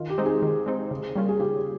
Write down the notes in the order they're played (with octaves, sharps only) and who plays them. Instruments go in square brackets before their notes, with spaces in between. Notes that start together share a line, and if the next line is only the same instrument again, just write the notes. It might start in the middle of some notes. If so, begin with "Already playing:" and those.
Already playing: [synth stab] D#3 [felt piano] F4
[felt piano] G4
[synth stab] G#3 C4 D#4
[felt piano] G#4
[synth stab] D#3
G#3 C4 D#4
C#3
G3 A#3 C#4 F4
[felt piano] G#4
[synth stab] C#3 [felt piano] G4